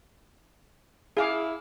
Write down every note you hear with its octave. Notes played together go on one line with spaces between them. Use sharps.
E4 G#4 F5 D6